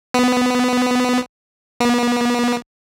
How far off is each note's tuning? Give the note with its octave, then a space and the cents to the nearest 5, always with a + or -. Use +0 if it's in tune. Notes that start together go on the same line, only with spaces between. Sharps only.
B3 +15
B3 -40